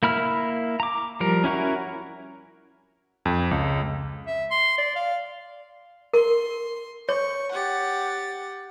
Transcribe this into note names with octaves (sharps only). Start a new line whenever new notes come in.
A#3 E4 B5 F6
A#5 D6
F3 G3 A#4
C#4 E4 F#4 A#4
F2
C#2
E5
C6
D5
F5
A#4 C6
C#5 C#6
G4 F#5 A6